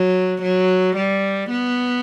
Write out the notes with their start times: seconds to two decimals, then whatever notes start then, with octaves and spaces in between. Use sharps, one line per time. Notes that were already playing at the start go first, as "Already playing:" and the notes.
Already playing: F#3
0.42 F#3
0.96 G3
1.50 B3